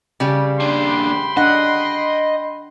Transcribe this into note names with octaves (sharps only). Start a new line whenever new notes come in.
C#3 G3
D#2 D4 G5 B5 C6
D4 D#5 F#5